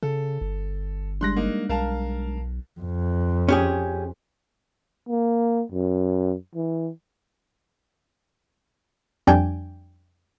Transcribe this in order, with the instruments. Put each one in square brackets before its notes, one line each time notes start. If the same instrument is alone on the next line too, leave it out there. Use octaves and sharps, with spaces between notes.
[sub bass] C#3 [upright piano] A4
[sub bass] G1
[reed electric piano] G3 G#3 D4 [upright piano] C6 F#6 A#6
[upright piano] A#3 D#4
[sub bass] B1 [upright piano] A#4 F5 A5
[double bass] F2
[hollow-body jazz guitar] C#4 G4 G#4
[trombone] A#3
F#2
E3
[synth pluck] F2 G3 D4 G5 G#5